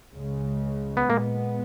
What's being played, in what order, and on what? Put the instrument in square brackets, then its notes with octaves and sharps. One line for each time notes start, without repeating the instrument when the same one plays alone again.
[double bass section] C#2 C#3 G#3
[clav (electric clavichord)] B3
[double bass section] A#2 G#3 B3 [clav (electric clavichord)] A#3